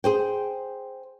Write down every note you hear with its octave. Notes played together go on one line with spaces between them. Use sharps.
G#4 C5 G5